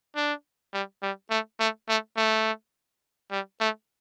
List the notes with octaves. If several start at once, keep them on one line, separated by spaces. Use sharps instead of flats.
D4
G3
G3
A3
A3
A3
A3
G3
A3